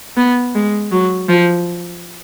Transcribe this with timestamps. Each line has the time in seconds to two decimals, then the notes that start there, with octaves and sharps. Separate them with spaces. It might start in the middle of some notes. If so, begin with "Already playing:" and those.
0.17 B3
0.55 G#3
0.92 F#3
1.29 F3